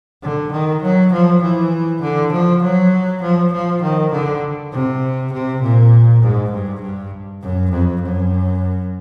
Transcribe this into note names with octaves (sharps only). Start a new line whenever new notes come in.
D3
D#3
F#3
F3
E3
D3
F3
F#3
F3
F3
D#3
D3
C3
C3
A#2
G#2
G2
G2
F#2
F2
F#2